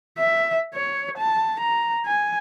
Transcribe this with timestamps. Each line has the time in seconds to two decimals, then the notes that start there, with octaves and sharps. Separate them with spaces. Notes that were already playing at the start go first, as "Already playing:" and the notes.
0.18 E5
0.74 C#5
1.18 A5
1.60 A#5
2.06 G#5